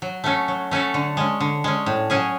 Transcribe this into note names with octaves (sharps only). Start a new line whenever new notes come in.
F#3
A3 C#4 F#4 A4
F#3
A3 C#4 F#4 A4
D3
G#3 C#4
D3
G#3 C#4
A2
F#3 C#4 G#4